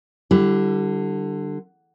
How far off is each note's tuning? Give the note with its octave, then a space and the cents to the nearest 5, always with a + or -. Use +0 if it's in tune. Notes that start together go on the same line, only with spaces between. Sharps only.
D3 +20 G3 -10 E4 +30